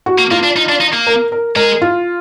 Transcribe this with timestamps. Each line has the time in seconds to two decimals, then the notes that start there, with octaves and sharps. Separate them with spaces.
0.06 F#4
0.18 A#3
0.31 A#3 F4
0.43 D4
0.56 D#4
0.69 D4
0.81 D#4
0.94 A#3
1.07 A#4
1.32 A#4
1.56 G#3 A#4
1.82 F4